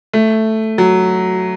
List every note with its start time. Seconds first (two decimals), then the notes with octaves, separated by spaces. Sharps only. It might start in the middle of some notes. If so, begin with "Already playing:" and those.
0.13 A3
0.78 F#3